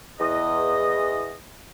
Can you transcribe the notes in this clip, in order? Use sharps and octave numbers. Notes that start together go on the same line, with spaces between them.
E2 D#5